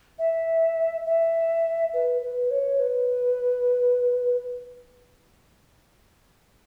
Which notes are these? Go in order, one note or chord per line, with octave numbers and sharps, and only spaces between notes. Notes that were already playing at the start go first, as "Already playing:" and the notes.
E5
E5
B4
B4
C#5
B4